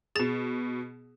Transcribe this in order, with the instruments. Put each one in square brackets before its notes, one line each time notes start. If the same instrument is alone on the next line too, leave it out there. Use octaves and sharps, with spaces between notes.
[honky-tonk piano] B2 E7 [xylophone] G#4 A6